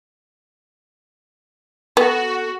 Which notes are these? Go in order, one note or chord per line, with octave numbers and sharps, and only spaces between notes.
B3 F#4 A4